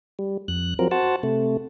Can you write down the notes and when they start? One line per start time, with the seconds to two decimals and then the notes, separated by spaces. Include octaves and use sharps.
0.19 G3
0.48 F2 F#6
0.79 F3 F#3 C4 A#4
0.91 F#4 C5 F#5 A5
1.23 C3 A3